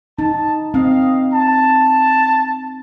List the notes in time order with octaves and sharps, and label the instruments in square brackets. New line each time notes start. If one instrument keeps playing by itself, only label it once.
[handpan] D#4 [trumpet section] A5
[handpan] C4 [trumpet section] D#5 F5
[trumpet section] A5